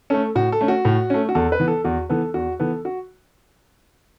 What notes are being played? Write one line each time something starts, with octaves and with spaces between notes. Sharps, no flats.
A3 C#4 A4
A2 F#4
A4
A3 C#4
F#4
A2
A3 C#4
F#4
E2 A4
B4
E3 B3
A4
E2 F#4
E3 B3 A4
E2 F#4
E3 B3 A4
F#4